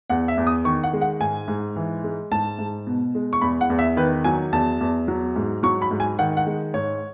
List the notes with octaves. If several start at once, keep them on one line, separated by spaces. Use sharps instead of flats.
E2 F#5
E5
E2
D#6
D#3 C#6
F#5
G#3
F#5
G#2 G#5
G#2
E3
G#3
G#2 A5
G#2
B2
G#3
C#6
E2 B5
F#5
E2
E5
D#3 B4
F#3 G#5
E2 A5
E2
F#3
G#2
F#3 C#6
B5
G#2
G#5
D#3 F#5
F#5
G#3
G#2 C#5